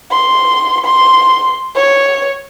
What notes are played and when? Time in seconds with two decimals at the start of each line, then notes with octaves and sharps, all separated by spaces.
0.11 C6
0.85 C6
1.75 C#5